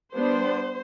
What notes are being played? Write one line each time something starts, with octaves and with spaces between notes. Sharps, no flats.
G3 B3 D4 C5